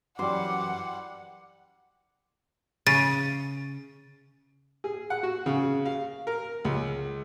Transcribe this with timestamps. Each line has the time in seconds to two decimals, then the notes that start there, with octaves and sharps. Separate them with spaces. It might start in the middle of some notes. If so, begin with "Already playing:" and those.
0.19 F#2 E3 G3 F#4 F#5 C6 D6
2.87 C#3 A6 D#7
4.84 G#4
5.10 F#5
5.23 F#4
5.46 C#3
5.85 F5
6.27 A#4
6.65 C#2